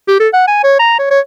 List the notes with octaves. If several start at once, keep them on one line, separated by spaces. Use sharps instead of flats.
G4
A4
F#5
G#5
C#5
A#5
C#5
C#5